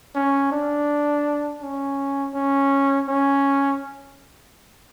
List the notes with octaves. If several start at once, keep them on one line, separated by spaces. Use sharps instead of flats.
C#4
D4
C#4
C#4
C#4